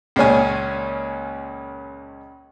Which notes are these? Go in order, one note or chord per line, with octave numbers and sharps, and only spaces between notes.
C#2 A#2 C#4 G#5